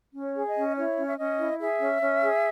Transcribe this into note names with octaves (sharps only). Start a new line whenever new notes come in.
C#4
C#5
G#4
D#5
C#4
E4 C#5
C#4
E5
C#4 D#5
E4
G#4 E5
C#4
C#4
G#4